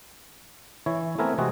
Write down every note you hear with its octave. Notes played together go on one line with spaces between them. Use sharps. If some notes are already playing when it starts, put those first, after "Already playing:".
E3 E4 C#5
A3 B3 C4 A#4 E5 G#5
C3 E3 G#3 C4 F#4 G#4